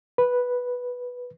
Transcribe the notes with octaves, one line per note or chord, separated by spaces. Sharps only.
B4